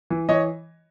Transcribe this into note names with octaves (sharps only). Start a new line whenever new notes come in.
E3
E3 C#5 D#5